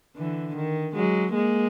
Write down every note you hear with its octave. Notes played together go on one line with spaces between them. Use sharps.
D3 E3
D#3
F#3 G#3
G#3 A#3